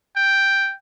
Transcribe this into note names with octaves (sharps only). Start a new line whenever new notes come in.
G5